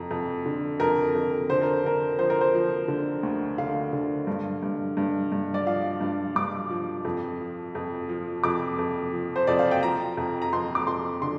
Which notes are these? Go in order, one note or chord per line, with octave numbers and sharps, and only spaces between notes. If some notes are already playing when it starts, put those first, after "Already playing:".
Already playing: F2 A#5
F2
D3
F2 A#4
F2
D3 C5
A#4
D3 A#4
F3 C5
A#4
C5
F3
D3
D2
D3 F5
D3
G2
G2
G2
G2
D5
F3 F5
G2
G2 D6
F3
F2
F3
F2
F3
F2 D6
F2
F3
C5
F2 D5
F5
G5
F3 A#5
F2
A#5
F2 C6
D6
F2 C6
D3 C6